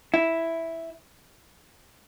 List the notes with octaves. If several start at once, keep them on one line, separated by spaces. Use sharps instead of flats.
E4